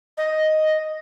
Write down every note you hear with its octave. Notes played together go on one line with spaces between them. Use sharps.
D#5